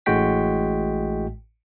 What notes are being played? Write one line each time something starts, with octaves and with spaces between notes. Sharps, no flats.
A1 A2 G#3 F#4 G5 B6